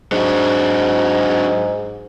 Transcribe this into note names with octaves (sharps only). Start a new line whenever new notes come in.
G#2 F#3 D4